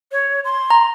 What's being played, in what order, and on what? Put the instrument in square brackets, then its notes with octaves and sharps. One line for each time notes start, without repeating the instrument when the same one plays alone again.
[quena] C#5
C6
[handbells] A#5